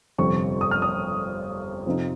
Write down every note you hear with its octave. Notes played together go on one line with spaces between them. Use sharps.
G1 F2 C3 C#6
D#6
F6
D#6
F2 C3 F3 C4 D#4